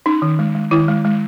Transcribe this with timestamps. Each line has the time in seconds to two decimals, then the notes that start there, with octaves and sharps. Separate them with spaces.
0.06 C#4 D#4
0.22 D#3
0.39 G#3
0.55 G#3
0.71 D#3 E4
0.88 G#3
1.05 G#3